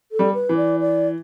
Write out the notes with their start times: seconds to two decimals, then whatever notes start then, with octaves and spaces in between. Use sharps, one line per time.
0.12 A4
0.19 G3
0.34 B4
0.49 E3
0.57 D5
0.80 D5